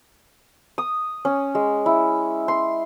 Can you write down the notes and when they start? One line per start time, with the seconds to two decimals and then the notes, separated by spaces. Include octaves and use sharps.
0.78 D#6
1.25 C#4
1.55 G#3
1.86 E4
2.48 C6